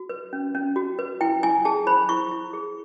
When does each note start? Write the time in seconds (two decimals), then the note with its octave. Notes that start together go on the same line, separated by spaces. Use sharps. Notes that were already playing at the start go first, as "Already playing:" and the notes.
Already playing: F#4
0.09 B4
0.33 C#4
0.55 C#4
0.76 F#4
0.99 B4
1.21 E4 G5
1.43 E4 G#5
1.65 G#4 A5
1.87 C5 B5
2.09 E4 C#6
2.31 E4
2.53 G#4